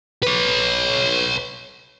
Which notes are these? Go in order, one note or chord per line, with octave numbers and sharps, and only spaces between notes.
B4 C#5